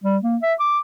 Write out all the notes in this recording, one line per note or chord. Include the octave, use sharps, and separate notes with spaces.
G3
A#3
E5
D6